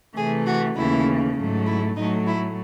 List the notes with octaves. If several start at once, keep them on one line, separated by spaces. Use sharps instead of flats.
C3 E3 A3 G#4
F#4
D#2 C#3 E3 A3 E4
G#2 F#3 A3
E4
A2 F#3 A3 D#4
E4